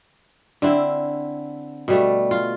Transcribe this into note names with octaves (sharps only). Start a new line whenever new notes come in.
D3 C4 E4
B2 G3 A3
F4